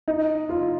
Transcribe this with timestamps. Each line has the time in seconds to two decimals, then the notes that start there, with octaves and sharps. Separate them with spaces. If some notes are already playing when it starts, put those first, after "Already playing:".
0.08 D#4
0.49 F4